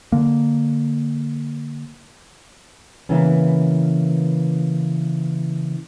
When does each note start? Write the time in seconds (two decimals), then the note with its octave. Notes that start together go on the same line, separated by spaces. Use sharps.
0.12 D3 A#3
3.09 C#3 E3 A#3 B3 C#4